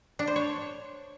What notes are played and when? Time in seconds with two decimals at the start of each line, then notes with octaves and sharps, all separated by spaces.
0.19 D4
0.27 C5
0.36 C#5